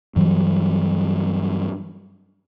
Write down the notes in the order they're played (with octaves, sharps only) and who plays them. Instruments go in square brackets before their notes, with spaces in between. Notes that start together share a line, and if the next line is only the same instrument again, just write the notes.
[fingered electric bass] G2 E3 F#3 G3